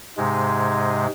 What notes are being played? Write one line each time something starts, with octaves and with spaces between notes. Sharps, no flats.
G#2 C3 G#3